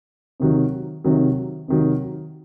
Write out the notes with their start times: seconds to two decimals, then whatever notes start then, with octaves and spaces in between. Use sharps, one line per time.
0.40 C3 D#3 F#3
1.04 C3 D#3 F#3
1.68 C3 D#3 F#3